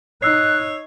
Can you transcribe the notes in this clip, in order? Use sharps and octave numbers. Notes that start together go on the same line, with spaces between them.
D#4 C#5 E6 F#6 C7